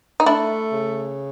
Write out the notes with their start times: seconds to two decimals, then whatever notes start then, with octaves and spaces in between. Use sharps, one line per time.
0.20 D#4
0.26 A3 D4 E4
0.73 C#3